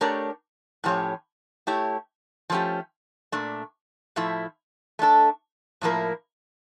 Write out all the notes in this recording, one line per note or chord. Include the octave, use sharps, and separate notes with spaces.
A3 D4 G4 A#4 C#5
A2 F3 C#4 G4 C#5
A3 E4 G4 C#5
F3 A3 C#4 G4
A#2 A3 D4
A2 F3 A3 E4
A3 D4 A4
A2 F3 A#3 E4 A#4